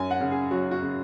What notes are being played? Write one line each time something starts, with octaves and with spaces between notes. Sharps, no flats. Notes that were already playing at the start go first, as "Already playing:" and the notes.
Already playing: F#2 G#5
F#5
C#3
G#4
F#3 F#4
F#4
C#3